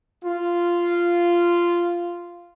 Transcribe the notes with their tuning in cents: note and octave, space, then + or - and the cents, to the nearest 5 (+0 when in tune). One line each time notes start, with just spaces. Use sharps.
F4 -10